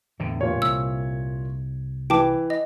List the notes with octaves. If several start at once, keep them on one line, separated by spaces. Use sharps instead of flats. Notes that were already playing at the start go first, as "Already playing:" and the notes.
E2 A2 D3
A#2 C#5
C2 E6
E3 G5 A5 D6
D#5